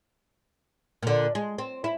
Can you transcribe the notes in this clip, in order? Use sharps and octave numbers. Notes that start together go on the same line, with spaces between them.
A#2 D3
G#3
C4
E4